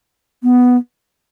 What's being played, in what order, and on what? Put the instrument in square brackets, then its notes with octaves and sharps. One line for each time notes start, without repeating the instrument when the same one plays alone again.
[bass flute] B3